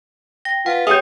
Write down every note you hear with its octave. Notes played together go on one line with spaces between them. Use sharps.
G5 A#6
F4 B4 F#5
G4 G#4 C#5 E5 F#5 G5 D#6 G6